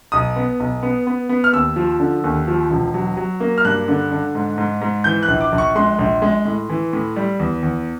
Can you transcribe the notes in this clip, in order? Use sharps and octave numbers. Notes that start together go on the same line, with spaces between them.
B1 D#6
B3
B1
B3
B3
B3
F6
D#2 E6
F3
D3
D#2
F3
E1
F#3
F#3
A#3
F6
G2 F#6
D3
D3
G#2
G#2
G#2
E3 G6
F#6
A#1
D6
A#1
C#6
G#3 C6
A#1
G#3
A2
E3
A2
G3
E2
E2